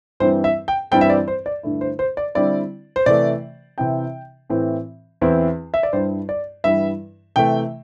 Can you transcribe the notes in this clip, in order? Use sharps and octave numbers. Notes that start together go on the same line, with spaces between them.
G2 E3 G3 C4 E4 C5
E5
G5
G2 E3 G3 C4 E4 G5
E5
D5
C5
D5
G2 D3 A3 E4
C5
C5
D5
D3 G3 C4 E4 D5
C5
C3 E3 A3 D5
C3 E3 C4 E4 G5
A2 E3 C4
E2 E3 C4 E4
E5
D5
G2 G3 E4 C5
D5
G2 E3 G3 E4 E5
C3 E3 A3 G5